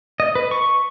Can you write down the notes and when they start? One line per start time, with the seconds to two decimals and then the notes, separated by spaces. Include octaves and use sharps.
0.20 D#5
0.35 B4
0.51 C#6